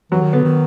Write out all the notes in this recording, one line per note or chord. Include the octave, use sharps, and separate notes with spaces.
E3 F#3
D#3
D3 B3
D#3